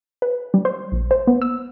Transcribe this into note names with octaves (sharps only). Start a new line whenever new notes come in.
B4
G3
C5
A#1
C5
B3
E6